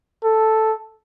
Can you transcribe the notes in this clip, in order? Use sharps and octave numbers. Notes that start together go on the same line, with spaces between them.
A4